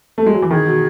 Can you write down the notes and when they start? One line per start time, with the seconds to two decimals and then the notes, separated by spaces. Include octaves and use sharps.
0.18 A3
0.26 G#3
0.34 F#3
0.42 E3
0.50 D#3 G#4
0.67 B2